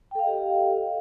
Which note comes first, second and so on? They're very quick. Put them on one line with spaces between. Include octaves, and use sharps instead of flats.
G5 A4 F5 D#5 G4